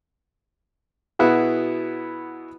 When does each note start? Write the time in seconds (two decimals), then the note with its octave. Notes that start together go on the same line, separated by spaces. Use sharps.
1.19 B2 B3 E4 F#4 G#4